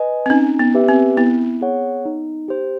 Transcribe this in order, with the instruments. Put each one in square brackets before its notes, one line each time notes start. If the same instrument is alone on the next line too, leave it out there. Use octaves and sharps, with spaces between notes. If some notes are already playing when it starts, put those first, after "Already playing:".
Already playing: [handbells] B4 D#5 G#5
[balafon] C4
[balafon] C#4 [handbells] D#4
[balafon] B3
[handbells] G4 B4 E5
[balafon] C4
[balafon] B3 [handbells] E4
[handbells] G#4 C#5 F#5
D#4
G4 C5